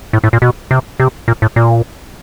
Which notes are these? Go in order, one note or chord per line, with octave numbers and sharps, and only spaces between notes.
A2
A2
A#2
B2
C3
C3
A#2
A2
A#2